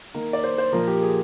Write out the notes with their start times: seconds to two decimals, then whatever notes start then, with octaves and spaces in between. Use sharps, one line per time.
0.14 D#3 A#3
0.33 D5
0.44 C5
0.58 C5
0.73 A#2 F3 A#3 A#4
0.87 G4
1.02 G#4